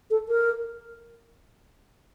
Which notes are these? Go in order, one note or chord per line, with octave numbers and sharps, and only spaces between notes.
A4
A#4